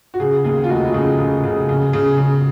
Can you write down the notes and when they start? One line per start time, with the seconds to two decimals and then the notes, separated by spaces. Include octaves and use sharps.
0.14 F#4
0.20 C#3 G#4
0.44 D#2 G#4
0.64 F4
0.69 F1 F#4
0.94 C#3
1.18 C#3
1.44 C#3
1.69 C#3
1.93 C#3
2.18 C#3